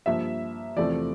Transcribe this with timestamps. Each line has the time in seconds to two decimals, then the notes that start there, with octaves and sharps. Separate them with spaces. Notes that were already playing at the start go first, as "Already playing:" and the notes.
0.06 G2 F3 A#3 E5
0.77 E2 C3 F3 A3 C4 D5